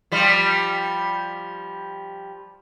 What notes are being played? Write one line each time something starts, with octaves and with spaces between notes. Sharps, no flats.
F3 G3